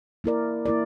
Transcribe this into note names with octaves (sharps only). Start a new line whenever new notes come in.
A#3 E4 A#4 D5
A#3 E4 A#4 D5